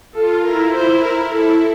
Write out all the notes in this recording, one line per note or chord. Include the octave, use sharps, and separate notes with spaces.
F4 A4
E4 A#4
E4 C5
A#4
E4 A4